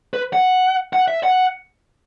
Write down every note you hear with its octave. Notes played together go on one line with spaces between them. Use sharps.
B4
F#5
F#5
E5
F#5